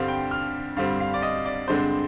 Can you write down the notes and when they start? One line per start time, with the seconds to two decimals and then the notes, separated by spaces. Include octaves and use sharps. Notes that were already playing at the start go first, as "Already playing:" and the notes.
Already playing: G2 D3 G3 C4 F5
0.08 G5
0.31 F6
0.76 G2 D3 G3 C4 F5
1.00 F5
1.14 D5
1.22 D#5
1.46 D5
1.68 G2 D3 G#3 C4 C5